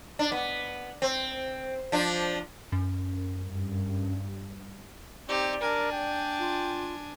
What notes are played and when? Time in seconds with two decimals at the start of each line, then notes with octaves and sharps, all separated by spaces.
0.19 D4
0.32 B3
1.02 C4
1.92 F3 D4
2.72 F#2
3.38 G2
5.28 C4 D#4 G4 D5
5.61 D4 A#4 G#5
5.92 G5
6.39 F4